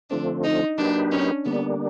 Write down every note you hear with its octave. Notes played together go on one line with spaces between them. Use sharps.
D3 F3 A3 C4 D4
D#4
F#3 A#3 D4 D#4 G4 B4
C#4
D3 G3 A#3 B3 D4